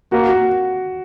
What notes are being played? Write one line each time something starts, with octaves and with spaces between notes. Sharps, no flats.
A#3 F#4
F#4